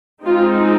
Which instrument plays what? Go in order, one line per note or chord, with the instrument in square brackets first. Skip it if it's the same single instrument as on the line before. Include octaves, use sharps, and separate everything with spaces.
[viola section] G#3 C4 D#4 F4